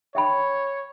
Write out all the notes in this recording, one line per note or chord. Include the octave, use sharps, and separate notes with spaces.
C#5 E5 G5 B5